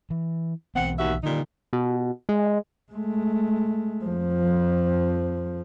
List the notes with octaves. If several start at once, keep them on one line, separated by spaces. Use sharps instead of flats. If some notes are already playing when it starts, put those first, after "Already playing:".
E3
B1 E3 B3 C4 F#5
D#2 F#4 E5
A#2 D3 D#3 G3 D#4
B2
G#3
G#3 A3
F2 F3